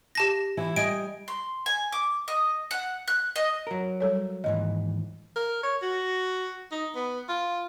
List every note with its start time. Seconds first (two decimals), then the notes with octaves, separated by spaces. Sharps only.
0.15 G4 A5 A#6
0.57 E3 E4
0.76 G3 D#5 G#5 D7
1.28 C6
1.66 G#5
1.92 D6
2.28 D#5
2.71 F#5
3.08 F#6
3.36 D#5
3.67 F#3 A#4
4.00 G3 A4 C#5
4.44 D#2 G#2 E3 D#5
5.36 A#4
5.63 C#5
5.82 F#4
6.71 D#4
6.95 B3
7.29 F4